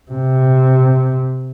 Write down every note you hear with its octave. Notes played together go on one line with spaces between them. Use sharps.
C3